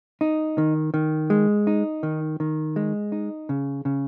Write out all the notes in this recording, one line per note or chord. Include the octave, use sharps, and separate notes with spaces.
D#4
D#3
D#3
G#3
D#4
D#3
D#3
G#3
D#4
C#3
C#3